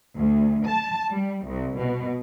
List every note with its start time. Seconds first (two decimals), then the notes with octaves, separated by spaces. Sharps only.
0.18 D2
0.68 A5
1.13 G3
1.47 C2
1.80 B2